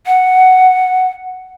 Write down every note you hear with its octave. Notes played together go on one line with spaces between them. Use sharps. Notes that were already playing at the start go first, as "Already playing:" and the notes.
F#5